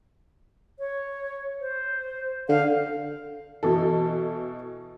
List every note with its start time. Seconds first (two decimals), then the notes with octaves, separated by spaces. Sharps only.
0.79 C#5
1.61 C5
2.49 D3 F5
3.63 B2 E3 A4